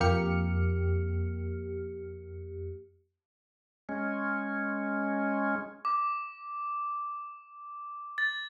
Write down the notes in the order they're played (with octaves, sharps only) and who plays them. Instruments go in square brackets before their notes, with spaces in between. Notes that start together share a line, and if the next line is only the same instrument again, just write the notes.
[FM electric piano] F2 A#3 G4 F6 C#7
[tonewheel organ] G#3 C#4
[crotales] D6
A6